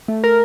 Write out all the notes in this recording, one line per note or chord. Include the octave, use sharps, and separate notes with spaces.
A3
A#4